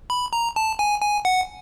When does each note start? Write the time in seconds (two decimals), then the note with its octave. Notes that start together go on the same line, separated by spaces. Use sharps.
0.10 B5
0.33 A#5
0.56 A5
0.79 G#5
1.02 G#5
1.25 F#5